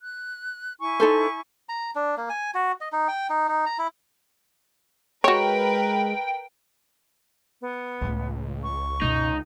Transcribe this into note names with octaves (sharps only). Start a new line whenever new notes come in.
F#6
E4 G#5 C#6
D#4 A4 C5
A#5
D4
A#3
G#5
F#4
D#5
D#4
G5
D#4
D#4
A#5
E4
G#3 F#4 A#4 B4 C#5 G5
B3
C#2 A2 A3
C#6
F#2 B2 D#4